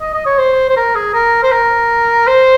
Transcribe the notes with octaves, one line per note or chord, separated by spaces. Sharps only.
D#5
D#5
C#5
C5
C5
A#4
G#4
A#4
C5
A#4
C5